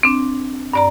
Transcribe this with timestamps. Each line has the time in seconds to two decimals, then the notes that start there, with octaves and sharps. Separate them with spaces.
0.03 C4 D4
0.73 G2 D5 A#5